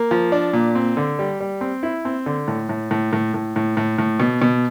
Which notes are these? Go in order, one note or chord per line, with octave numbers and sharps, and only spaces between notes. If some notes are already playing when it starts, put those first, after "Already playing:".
Already playing: A#3
F3
D4
A#2
C4
D3
G3
G3
C4
E4
C4
D3
A2
A2
A2
A2
A2
A2
A2
A2
B2
B2